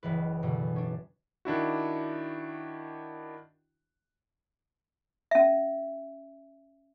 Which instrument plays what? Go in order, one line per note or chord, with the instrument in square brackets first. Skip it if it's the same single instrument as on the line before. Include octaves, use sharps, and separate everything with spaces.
[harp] F#1 C#2 E3 B4
F#2 B2 D3
C#4 D4
[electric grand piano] D#3 D4 E4 F#4
[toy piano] C#4 E5